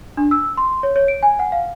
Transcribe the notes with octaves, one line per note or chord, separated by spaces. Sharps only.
D4
E6
C6
C#5
C#5
D7
G#5
F#5
F5